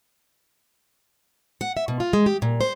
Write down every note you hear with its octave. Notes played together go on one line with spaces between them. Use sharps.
F#5
E5
B2
F4
G#3
G4
A#2
C5